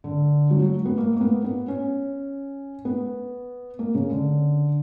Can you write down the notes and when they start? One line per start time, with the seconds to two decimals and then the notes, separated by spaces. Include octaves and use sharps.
0.04 D3
0.51 F#3
0.62 F#3
0.85 B3
0.98 A#3
1.16 A#3
1.21 B3
1.44 B3
1.68 C#4
2.85 B3
3.79 A#3
3.95 C#3
4.11 D3